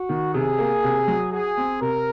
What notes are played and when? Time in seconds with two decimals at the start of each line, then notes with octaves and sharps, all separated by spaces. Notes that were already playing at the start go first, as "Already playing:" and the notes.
Already playing: F#4
0.09 D#3
0.34 C3 G#4
0.59 A#3
0.84 C3
1.08 F#3
1.32 F#4 G#4
1.57 C4
1.81 C3 A#4